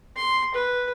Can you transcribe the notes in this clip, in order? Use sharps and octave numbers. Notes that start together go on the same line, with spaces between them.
C6
B4